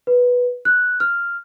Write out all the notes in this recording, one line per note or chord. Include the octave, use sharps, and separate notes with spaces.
B4
F#6
F6